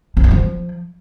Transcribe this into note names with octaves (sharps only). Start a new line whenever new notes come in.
C4
B3
F3